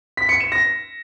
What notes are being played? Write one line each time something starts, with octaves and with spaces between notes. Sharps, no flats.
B6
C#7
E7
A#6